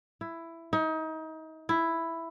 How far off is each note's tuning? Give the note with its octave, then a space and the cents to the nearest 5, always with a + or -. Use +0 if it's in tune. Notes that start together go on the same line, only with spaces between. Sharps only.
E4 +10
D#4 +30
E4 +5